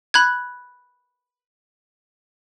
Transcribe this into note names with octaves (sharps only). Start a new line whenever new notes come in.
B5 F#6 G#6